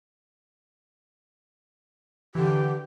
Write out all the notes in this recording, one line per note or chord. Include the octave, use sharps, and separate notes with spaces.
D3 E3 G4